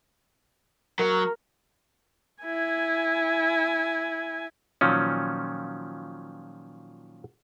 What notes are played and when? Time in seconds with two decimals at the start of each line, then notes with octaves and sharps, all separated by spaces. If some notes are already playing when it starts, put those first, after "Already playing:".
0.99 F#3 A#4
2.44 E4 G#5
4.81 A#2 D#3 F3 F#3 C#4